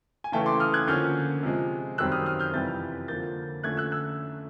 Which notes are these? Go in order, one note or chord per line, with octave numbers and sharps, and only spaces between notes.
G#5
C#3 E3 A3 C#4 G5 A5
C6 D6
D#6 F6
F#6 G#6
D3 F3 A#3 C#4 F6 G6
C3 F3 G#3
F#2 D#3 G3 C4 E6 F#6
D#6 F6
D#6 F6
F6 G6
F2 C3 E3 G3 G6 A6
D3 F3 A#3 G6 A6
D3 F3 A3 C#4 F#6 G#6
E6 F#6
E6 F#6